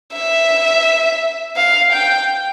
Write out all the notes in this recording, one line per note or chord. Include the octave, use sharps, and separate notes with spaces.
E5
F5
G5